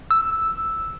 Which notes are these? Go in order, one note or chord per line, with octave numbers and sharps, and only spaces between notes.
E6